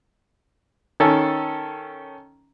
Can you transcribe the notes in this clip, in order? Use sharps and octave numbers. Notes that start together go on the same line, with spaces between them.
D#3 C#4 A4